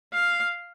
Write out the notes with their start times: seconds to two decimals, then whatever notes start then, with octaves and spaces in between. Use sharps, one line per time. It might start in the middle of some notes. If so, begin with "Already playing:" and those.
0.14 F5